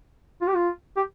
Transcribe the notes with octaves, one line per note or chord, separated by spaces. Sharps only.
F4
G4
F4
G4